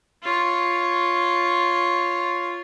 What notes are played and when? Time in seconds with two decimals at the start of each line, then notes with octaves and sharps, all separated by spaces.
0.23 F4 C#5